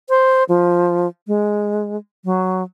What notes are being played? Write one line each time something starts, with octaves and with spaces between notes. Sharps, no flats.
C5
F3
G#3
F#3